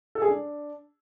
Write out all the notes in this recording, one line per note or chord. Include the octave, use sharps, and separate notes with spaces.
A4
G#4
D4